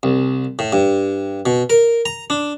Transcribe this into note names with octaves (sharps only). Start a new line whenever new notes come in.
C2
A2
G2
B2
A#4
A#5
D4